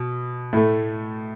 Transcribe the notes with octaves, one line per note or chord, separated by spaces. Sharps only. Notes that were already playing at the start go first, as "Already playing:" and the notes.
Already playing: B2
A2 A3